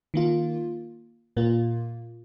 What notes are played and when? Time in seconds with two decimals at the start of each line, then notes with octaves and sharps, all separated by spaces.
0.14 D#3 A#3 F4
1.37 A#2 A#3 F4